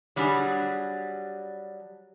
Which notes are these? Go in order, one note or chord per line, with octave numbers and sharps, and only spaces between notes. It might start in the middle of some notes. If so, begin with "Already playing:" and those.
F#3 G3 D4 G#4